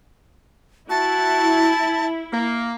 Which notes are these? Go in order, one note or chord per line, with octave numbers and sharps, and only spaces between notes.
E4 F#4 A5
A#3